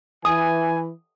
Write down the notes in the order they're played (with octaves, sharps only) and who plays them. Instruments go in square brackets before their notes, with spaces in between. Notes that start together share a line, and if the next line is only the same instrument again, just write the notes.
[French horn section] E3 [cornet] G#5 [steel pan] D#6